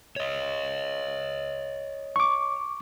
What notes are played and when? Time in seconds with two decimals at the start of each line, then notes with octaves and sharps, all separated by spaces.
0.16 C#5 D#5
2.16 C#6 D6